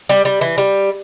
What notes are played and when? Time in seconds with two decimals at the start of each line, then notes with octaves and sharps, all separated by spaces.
0.09 G3
0.25 G3
0.41 E3
0.58 G3